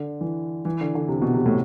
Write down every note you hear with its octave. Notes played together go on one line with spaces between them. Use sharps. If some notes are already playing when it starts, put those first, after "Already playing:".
Already playing: D3
E3
E3
D3
D3
C3
B2
C3
A2